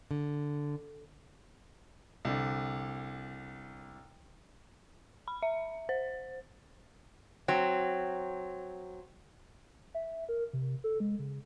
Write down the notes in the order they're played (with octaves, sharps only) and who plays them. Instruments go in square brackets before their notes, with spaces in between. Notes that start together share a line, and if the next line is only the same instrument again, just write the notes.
[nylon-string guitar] D3
[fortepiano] C2 D3
[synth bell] B5
E5
C5
[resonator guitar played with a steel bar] F#3 C4
[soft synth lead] E5
A#4
C3
A4
G#3
C#3